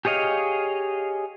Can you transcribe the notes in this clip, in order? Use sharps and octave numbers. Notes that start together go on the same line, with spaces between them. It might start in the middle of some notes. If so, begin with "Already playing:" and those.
G4 G#4 C#5 D#5 F5